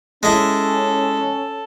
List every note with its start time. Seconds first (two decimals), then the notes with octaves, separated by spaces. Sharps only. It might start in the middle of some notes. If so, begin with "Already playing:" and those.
0.23 G#3 C#4 E4 A4